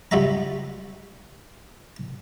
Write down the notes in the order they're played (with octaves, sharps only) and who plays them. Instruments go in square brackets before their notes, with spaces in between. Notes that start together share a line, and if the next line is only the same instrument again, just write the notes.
[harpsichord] C#2 G3 F4 F#4 E5 A#5